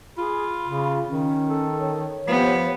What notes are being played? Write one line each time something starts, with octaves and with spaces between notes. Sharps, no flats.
F4 G#4 B5
C#3
D#3 C#4
A4
C#5
F3 B3 G4